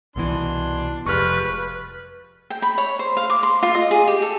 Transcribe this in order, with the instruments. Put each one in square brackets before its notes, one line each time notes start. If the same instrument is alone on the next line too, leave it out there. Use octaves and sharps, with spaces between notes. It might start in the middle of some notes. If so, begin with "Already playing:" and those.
[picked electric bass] C2 B2 E3 [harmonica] D4 C6
[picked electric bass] F1 [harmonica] F3 G3 G#3 [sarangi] B4 [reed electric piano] C#6 F6
[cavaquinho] G5
B5
C#5
C5
F5
D6
C6
F4
D#5
G#4
G4
A4